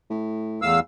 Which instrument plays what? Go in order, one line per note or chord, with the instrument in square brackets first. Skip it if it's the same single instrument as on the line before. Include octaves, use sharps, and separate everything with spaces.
[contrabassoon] A2
[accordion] E2 F5 E6 [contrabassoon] A2